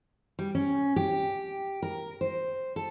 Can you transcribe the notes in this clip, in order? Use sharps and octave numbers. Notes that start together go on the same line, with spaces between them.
G3
C#4
G4
A#4
C5
A4